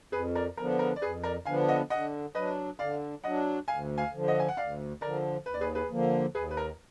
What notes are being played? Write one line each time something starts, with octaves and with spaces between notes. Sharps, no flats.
F2 G#4 B4
A#4 D5
D3 F3 B3 D4 A#4
A#4
D5
F2 G#4 B4
A#4 D5
D3 F3 B3 D4 F5 G#5
D#5 F#5
D3 D#5 F#5
F#3 D4 B4 D#5
D3 D5 F5
F#3 D4 D#5 F#5
D2 F5 G#5
F5 G#5
D3 F3
D#5 F#5
G#5
F#5
D2 D5 F5
D3 F3 A#4 D5
D#2 B4
D5
G#4 B4
G#4 B4
D3 F3 A#3
D#2 G#4 B4
B4
A#4